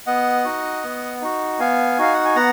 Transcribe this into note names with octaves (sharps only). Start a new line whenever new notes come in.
B3 D#5 F#5
D#4 F#4
B3
D#4 F#4
B3 F5 G#5
D#4 F#4 F5
F#5
G#5
B3 F#5 A#5